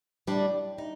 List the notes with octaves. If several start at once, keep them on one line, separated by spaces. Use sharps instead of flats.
A2 G3 D4 D5
D#4